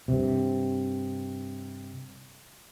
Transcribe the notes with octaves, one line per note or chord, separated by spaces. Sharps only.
G2 C3